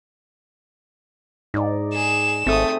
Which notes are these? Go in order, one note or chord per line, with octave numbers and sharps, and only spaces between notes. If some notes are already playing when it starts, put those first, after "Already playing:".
G#2 D#4 D5
G#4 E7
G#1 A3 C4 G#4 A4 D#6